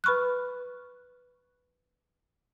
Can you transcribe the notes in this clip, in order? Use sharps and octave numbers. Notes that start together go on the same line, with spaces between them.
B4 B5 C#6 F6 F#6